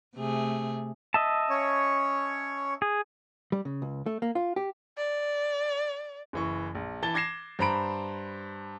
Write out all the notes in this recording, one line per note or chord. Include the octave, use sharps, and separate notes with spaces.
C3 A3 G#4
D#5 E5 A5
C#4 C#5
G#4
G3
C#3
C#2
A3
A#3
F4
G4
D5
F#1 E3 C#6
A#1
E3 A5 A6 G7
D6 G#6 A#6 C7 E7
G2 C5 A#5 B5 D7